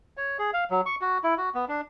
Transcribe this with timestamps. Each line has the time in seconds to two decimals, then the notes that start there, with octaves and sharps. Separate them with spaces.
0.17 C#5
0.39 G#4
0.53 F5
0.71 F#3
0.86 C#6
1.01 F#4
1.24 E4
1.38 F#4
1.55 B3
1.68 D4